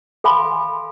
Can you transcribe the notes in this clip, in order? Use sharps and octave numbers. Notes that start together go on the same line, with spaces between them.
A4 F5 G#5 B5 C6